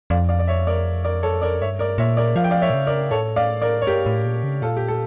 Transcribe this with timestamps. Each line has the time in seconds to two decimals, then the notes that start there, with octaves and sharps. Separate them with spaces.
0.10 F2 D5 F5
0.29 D5 F5
0.39 D5
0.47 C#5 E5
0.67 A#4 D5
1.04 A#4 D5
1.23 A4 C#5
1.42 A#4 D5
1.61 G2 C#5 E5
1.79 A#4 D5
1.98 A#2 C#5 E5
2.17 A#4 D5
2.36 F3 F5
2.44 G5
2.51 D5 F5
2.62 C#5 E5
2.70 A#2
2.74 C#3
2.87 A#4 D5
3.11 A2 A4 C#5
3.36 D5 F5
3.62 A#4 D5
3.82 C#5
3.86 G2 G4 A#4
4.06 A2
4.25 A#2
4.43 C#3
4.62 A#2 F4 A4
4.77 G4
4.88 A4